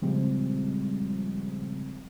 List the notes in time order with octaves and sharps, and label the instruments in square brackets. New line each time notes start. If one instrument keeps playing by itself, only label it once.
[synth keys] A#2 C#3 F3 G3 G#3 C4